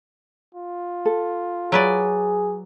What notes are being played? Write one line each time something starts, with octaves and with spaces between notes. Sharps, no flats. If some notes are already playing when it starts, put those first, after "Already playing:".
F4
A4
F#3 G#4 B4 D5